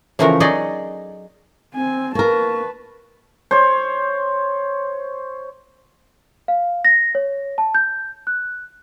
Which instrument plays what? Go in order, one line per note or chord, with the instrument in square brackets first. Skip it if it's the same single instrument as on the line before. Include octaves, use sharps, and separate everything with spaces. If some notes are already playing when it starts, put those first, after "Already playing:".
[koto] C#3 E3 F3 A3 F#4 A#4
F#3 D#4 G#4 D5 D#5
[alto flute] C4 [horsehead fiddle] G#5
[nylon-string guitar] A#3 A#4 [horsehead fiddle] B4 A5 [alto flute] C#6
[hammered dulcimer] C5 C#5
[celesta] F5
A#6
C#5
A5
G6
F#6